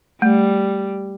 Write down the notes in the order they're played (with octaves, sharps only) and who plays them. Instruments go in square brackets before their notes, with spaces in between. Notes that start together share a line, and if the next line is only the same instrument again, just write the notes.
[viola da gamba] G3 [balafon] A3